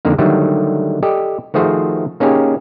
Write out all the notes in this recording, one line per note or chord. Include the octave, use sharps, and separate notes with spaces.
F2 D3 D#3 A#3
D3 D#3 F#3 G3 A3
G4 A4 D5 D#5
D#3 F3 A3 F#4 G#4 C5
A#3 C#4 D#4 G4 G#4